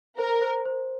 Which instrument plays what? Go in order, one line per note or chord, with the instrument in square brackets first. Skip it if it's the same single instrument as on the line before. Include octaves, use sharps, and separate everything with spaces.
[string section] A#4 [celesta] C5
[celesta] C5
C5